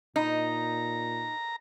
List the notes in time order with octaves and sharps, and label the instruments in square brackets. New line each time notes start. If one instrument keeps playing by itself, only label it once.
[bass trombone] A#2 [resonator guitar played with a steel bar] D#4 [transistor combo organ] A#5